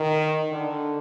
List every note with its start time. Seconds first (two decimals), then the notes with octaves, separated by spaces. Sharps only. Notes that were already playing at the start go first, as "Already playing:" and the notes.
Already playing: D#3
0.52 D3